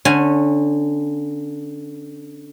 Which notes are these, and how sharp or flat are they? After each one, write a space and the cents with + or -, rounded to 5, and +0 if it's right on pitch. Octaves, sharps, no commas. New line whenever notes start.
D3 +0 C#4 -20 G#5 +0